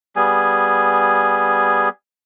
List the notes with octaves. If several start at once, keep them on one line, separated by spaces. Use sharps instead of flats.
G3 B3 G#4 G#5